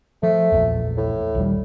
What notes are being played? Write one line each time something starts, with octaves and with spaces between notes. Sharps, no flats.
F3 A3
A#1 E2
A2
A#1 D#2 G3